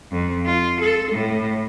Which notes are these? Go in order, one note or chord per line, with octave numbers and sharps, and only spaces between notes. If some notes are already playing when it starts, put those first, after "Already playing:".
F2
F4
A4
A2